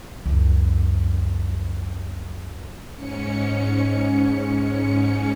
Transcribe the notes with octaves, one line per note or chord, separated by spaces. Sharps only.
C#2 F#2
G#2 C#4 C#7